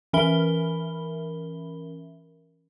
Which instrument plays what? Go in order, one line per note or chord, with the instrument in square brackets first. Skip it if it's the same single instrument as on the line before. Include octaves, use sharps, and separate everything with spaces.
[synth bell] E3 C#4 A#4 E5 B5 G7